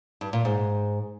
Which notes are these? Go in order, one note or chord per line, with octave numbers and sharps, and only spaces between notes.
G2
A#2
G#2